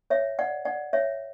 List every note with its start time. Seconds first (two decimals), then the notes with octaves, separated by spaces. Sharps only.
0.10 C#5 E5
0.39 D5 F#5
0.65 D5 F#5
0.93 C#5 E5